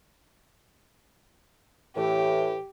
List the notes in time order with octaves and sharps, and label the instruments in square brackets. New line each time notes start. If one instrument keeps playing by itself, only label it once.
[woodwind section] A2 E3 [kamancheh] G4